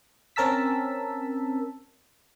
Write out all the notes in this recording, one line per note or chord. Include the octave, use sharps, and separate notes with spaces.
C4 C#4 A#4 A5 E6 B6